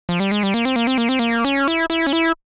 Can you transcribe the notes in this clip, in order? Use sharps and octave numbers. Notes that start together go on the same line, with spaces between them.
F3
G3
G#3
G3
A#3
C4
A#3
C4
A#3
C4
A#3
C#4
E4
E4
C#4
E4